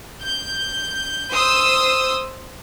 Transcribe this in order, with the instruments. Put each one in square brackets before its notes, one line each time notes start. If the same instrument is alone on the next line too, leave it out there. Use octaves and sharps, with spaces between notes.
[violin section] G6
C5 D#6 E6